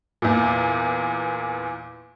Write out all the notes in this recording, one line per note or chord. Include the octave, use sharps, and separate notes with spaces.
E2 A#2